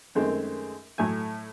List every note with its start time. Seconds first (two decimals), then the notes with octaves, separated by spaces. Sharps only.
0.15 F#2 D#3 G#3 A3 C4
0.98 A2 F#3 A3 G#5